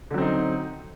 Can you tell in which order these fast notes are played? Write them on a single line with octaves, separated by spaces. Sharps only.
D3 F#3 C4 D#4